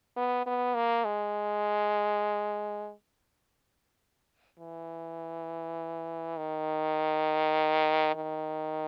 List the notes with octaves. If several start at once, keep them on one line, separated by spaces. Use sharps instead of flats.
B3
B3
A#3
G#3
E3
D#3
D#3